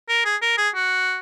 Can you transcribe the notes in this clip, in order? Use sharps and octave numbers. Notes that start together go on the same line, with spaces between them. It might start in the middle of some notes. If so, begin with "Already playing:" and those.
A#4
G#4
A#4
G#4
F#4